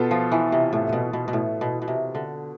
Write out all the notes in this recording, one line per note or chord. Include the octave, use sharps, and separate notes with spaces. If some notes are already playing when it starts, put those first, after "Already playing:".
Already playing: B2 B3 F4 A4
F3
E3
C3
A2
B2
B2
B2
A2
B2
B2
C3
D3